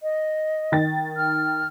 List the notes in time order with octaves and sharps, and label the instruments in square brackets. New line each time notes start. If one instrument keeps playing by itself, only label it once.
[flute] D#5
[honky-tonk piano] D#3 A6
[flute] F6